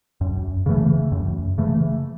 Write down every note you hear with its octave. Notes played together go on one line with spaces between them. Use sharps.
F#2
C#3 E3 A3
F#2
C#3 E3 A3